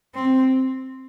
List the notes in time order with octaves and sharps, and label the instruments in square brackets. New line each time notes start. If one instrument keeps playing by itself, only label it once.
[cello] C4